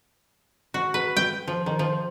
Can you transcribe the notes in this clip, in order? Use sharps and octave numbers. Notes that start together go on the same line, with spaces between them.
F#4
B4
G5
F3
D#3
F3